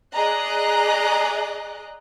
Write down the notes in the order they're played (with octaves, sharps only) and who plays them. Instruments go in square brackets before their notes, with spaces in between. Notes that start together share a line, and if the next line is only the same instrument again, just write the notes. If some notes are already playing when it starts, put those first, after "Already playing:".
[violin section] G#4 D5 D#5 A#5 F#6